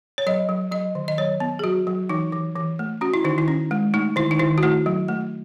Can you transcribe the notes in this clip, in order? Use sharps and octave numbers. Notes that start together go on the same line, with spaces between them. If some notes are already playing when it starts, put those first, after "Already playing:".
C#5
F#3 D#5
F#3
F#3 D#5
D#3
D#5
F#3 C#5
B3
G#4
F#3 F#4
F#3
E3 D#4
E3
E3
A3
C#4 F#4
E4
D#3 D#4
E4
C#4
G#3
A3 D#4
D#3 E4
D#4
D#3 E4
F#4
A3 E4
F#3
A3